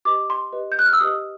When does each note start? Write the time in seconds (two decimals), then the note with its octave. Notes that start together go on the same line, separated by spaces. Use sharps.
0.05 G4 B4 D#5 D6
0.30 C6
0.53 G4 B4 D#5
0.72 G6
0.79 F#6
0.86 F6
0.93 E6
1.00 G4 B4 D#5 D#6